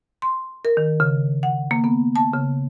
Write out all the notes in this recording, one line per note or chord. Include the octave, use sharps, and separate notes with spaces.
C6
A#4
D#3
C#3
F#5
A#3
B3
A5
C#3